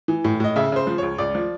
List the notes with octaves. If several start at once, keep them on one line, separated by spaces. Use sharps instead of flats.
E3
A2
A2 D#5
C#3 E5
C#3 C5
F3
C#2 C#5
C#2 D5
F3